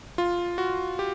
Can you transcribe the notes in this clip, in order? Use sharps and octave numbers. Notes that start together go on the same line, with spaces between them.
F4
F#4
G4